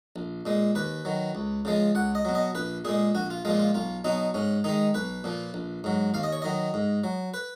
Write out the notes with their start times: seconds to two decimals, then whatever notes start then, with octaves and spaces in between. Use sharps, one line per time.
0.16 A#1
0.45 A#2 G#3
0.75 D#2 B4
1.05 D#3 F#3
1.35 C#2
1.65 C#3 F3 G#3
1.95 C#2 F#5
2.15 D#5
2.25 B2 F#3
2.35 D#5
2.55 A#1 B4
2.85 A#2 G#3 G#4
3.15 A#1 F#4
3.30 F4
3.45 A#2 F3 G#3 F4
3.59 F4
3.74 B1 F4
4.04 B2 F#3 D#4
4.34 G#2 C#4
4.64 D#3 G#3 D#4
4.94 B1 B4
5.24 A#2 F3
5.54 A#1
5.84 G#2 F#3
6.14 D#2 F5
6.23 D#5
6.32 C#5
6.42 D#3 F#3 D#5
6.74 G#2
7.04 F#3
7.34 B4